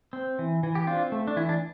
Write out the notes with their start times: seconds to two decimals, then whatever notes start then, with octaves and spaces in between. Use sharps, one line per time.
0.13 C4
0.39 E3
0.63 E3
0.75 G4
0.87 C4 D4 F4
1.12 A3
1.27 D4
1.37 E3 E4
1.49 D4